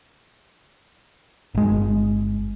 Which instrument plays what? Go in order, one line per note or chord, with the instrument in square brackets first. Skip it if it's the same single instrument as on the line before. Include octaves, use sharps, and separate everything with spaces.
[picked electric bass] G1 G#3